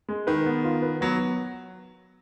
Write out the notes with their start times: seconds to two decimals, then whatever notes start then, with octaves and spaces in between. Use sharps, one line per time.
0.09 G#3
0.27 D#3 B4
0.46 B3
0.64 F4
0.82 B4
1.01 F#3 B3